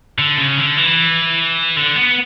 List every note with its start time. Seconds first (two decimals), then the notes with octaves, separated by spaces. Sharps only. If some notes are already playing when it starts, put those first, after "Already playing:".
0.19 D3
0.38 C#3
0.57 D3
0.77 E3
1.77 D3
1.96 B3